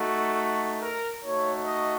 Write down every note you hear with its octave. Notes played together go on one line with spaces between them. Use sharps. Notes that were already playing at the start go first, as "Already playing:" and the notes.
Already playing: A3 D#4 F#4
A#4
A3 D#4 F#4 C#5
D#5